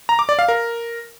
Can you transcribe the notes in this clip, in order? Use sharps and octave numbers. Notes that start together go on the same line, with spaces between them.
A#5
D6
D5
F5
A#4